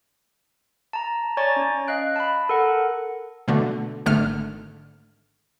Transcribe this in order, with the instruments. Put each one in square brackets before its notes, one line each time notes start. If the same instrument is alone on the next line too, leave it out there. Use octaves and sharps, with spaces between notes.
[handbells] A5 A#5
C#5 D5 G#5 A#5 C#6 A6
C#4
D#5 F5 F#6 D7
A5 B5
A4 A#4 F#5
[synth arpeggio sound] B2 D3 A3
G#1 D3 A3 F6